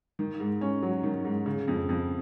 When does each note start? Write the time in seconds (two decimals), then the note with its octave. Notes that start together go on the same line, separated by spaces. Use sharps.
0.19 D#3
0.40 G#2
0.61 C#4
0.83 F#3
1.03 D#3
1.25 G#2
1.46 C#3
1.68 F2
1.89 F2